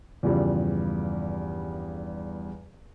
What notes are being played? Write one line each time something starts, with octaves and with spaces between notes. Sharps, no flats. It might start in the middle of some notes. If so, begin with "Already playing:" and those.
E2 G2 C#3 F3 G3